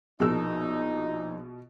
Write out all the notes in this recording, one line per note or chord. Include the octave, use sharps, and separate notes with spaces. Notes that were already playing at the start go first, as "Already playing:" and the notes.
A#1 B2 D#4 G#4 A#4 A5 E6